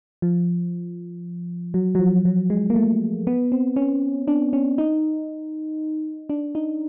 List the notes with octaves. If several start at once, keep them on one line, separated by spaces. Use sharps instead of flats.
F3
F#3
F#3
F3
F#3
G#3
A#3
A3
B3
C4
C#4
D4
C#4
D#4
D4
D#4